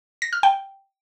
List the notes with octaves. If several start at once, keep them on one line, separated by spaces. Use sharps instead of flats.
A#6
F6
G5